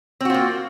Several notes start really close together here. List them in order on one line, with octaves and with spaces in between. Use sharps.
C4 F#4 F4 A#3